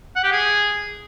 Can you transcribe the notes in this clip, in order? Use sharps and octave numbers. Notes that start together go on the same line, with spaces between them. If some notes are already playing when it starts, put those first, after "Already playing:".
F#5
G4
G#4